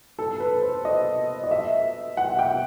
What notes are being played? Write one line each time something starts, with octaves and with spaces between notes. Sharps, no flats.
A4
B4
C5
D#5
D#5
E5
F#5
G5